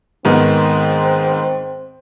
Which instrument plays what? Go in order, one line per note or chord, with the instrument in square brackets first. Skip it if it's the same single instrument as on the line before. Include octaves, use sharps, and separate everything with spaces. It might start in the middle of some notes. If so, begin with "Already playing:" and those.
[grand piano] G#2 D#3 B3 [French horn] C4